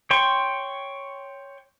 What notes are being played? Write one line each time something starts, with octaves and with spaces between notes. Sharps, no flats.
C#5 G5 C6 C#6